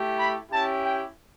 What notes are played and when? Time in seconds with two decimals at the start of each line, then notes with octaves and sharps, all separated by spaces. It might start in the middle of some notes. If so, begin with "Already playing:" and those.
Already playing: A3 E4 G4
0.17 B5
0.51 C#4 E4 G4 A5
0.85 G5